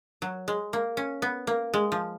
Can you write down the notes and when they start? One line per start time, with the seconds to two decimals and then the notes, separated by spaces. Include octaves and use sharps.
0.22 F#3
0.48 G#3
0.73 A#3
0.97 C#4
1.22 B3
1.47 A#3
1.74 G#3
1.92 F3